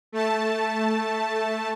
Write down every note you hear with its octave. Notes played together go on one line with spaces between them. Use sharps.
A3 A5